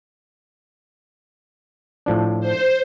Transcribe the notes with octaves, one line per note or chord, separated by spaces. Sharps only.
A2 F3 D4
C5